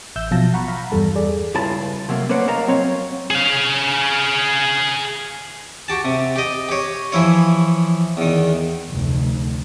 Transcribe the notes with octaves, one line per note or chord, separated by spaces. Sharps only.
A1 E5 E6 G6
B2 F3 F#3 F5 A5 A#6
F#5 A#5 B5 C#6
F5 A#5 B5
E2 G2 G3 A4 A5
G#4 A4 D5
C#2 G2 E4 F4 A5
C3 F#3 A3 A#3
A#3 C#4 B4 C5 D5 F#5
A#4 D#5 F5 A5 A#5
F#3 C4 C#5 F5
G#4 F5
F#4 G4 A5
C3
G4 D#5
G4 C#5
E3 F3 E4 C#5
E2 D#3
F1 D2